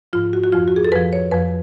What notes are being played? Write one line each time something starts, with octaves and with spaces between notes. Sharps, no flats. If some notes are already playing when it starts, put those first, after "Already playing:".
G#2 F3 F4
F#4
F#4
F2 F3 F4
F#4
G#4
A4
F2 F3 B4
C#5
F2 F3 B4